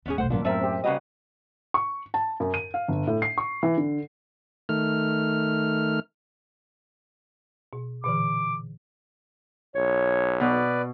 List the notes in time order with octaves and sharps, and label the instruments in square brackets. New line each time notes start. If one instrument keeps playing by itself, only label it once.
[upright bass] D#2 G#2 [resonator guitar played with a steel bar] B3 C#4 G#4
[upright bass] F1 B1 [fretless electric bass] A3 [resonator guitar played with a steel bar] C5 F#5
[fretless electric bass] G#1 F#2 [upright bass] A2 F#3 [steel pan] A#3 F4 [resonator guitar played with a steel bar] B3 D4
[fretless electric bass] F#2 [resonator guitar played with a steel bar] A3 E5 [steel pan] C4 A#4
[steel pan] C4 G4
[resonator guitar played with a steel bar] C#3 A#3 D#5 [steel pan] G3 F#4 B4
[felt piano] C#6
A5
F#2
D#7
F5
G1
A2
C7
C#6
E3
D3
[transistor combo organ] D#3 A3 F6
[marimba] B2
[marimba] A#2 D3 E3 [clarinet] D6
[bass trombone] B1 [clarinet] C#5
[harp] B2 [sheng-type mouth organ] B4 D5